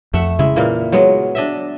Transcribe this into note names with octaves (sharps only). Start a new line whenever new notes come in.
F2 A3 E5 F#5
C#3 G#3 E4
A#2 E3 A#3
F#3 G#3 B3
D4 D#5 E5